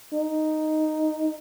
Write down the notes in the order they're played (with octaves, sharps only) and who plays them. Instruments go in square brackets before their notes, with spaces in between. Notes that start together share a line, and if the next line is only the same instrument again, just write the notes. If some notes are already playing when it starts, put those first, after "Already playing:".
[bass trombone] D#4